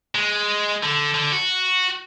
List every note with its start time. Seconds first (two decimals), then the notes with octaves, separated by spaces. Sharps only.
0.15 G#3
0.83 D3
1.15 D3
1.32 F#4